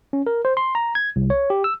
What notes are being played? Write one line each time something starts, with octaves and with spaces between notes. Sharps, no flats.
C#4
A#4
C5
C6
A#5
G#6
C2
C#5
G4
E6